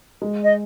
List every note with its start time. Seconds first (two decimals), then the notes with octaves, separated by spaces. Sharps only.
0.22 G#3
0.44 D#5